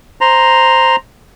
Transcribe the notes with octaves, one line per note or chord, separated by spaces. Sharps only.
C5 A#5